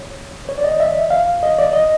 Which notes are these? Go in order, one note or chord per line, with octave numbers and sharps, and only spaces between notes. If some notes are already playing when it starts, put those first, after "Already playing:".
Already playing: C#5
C#5
D5
D#5
E5
F5
D#5
D5
D#5